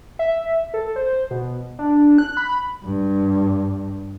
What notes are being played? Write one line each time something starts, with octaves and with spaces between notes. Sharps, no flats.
E5
A4
C5
B2
D4
F#6
B5
G2